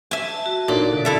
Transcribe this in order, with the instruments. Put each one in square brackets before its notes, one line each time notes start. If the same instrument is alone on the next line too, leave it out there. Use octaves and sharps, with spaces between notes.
[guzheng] E5 G#5 [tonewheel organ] A5
[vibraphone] F#4
[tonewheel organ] F#1 D4 F#4 [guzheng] A#2 [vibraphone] D#4 A4 D5
[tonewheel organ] B2 D3
[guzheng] E4 A4 E5 [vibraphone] D5 F5 A5